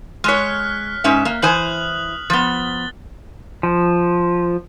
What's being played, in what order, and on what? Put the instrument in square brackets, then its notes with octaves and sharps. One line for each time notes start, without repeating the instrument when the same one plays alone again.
[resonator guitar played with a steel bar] G#3 C#5 [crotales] F6 F#6 B6
[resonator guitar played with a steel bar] G#2 C#4 E5
A#3
[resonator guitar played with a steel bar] E3 C5 G#5 [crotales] D#6 F#6 F#7
[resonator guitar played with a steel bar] F3 B3 [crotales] A6 G7
[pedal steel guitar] F3